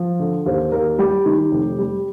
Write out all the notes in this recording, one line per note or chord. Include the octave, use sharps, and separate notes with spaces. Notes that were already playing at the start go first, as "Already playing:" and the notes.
Already playing: F3
D3
D#2 C5
D#2 A#4
G3 G4
D#3
F1
G3